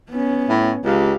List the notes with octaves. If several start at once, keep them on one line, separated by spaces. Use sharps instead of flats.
B3 C#4
A2
C#2 G4 F5